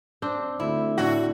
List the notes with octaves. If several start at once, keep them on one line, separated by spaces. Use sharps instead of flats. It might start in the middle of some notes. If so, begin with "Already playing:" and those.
C4 D4 C5
D2 E4
A2 D3 F#4